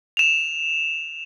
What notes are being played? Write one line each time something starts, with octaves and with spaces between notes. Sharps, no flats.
E7 F7